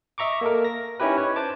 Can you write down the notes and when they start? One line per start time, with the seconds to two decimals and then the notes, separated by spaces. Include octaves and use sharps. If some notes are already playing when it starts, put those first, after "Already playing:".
0.18 D#5 E5 A#5 C#6 D6
0.41 A#3 A4 A#4
0.65 A#6
1.00 C#4 D#4 E4 G4 B4
1.18 C#5
1.36 B4 C5 A5 D6